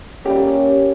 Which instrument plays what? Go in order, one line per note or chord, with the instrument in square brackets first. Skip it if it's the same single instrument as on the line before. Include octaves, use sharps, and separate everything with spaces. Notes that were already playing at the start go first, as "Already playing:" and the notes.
[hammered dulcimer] G3 A#3 C#4 [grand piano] G4
[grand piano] G4